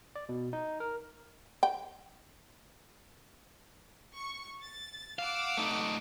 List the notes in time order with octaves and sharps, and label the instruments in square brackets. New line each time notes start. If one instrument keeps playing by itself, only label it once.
[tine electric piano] D5
B2
D#4
A#4
[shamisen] G5
[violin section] C#6
A6
[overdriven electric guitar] F5 [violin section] F#5 D6 E6
[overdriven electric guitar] A3 D#4